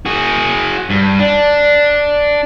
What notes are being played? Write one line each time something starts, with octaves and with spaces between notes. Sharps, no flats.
F#4 G#4
G2
D4